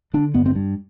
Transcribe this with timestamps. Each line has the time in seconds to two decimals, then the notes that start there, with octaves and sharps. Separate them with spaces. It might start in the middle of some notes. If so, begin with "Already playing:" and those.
0.14 D3 D4
0.34 G2 B3
0.46 C4
0.55 G2